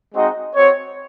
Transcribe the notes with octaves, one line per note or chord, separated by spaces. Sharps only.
G#3 C4 D#4 F#4 D#5
C4 F#4 C#5